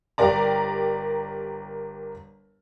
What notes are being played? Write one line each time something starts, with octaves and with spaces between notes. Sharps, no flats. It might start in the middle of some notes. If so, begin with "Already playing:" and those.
G1 G4 A#4 D5 A#5